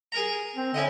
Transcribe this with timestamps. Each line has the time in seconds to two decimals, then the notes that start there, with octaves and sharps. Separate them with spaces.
0.12 G#4 A#4 A#5
0.56 C4
0.74 D3 C#4 E4 D#5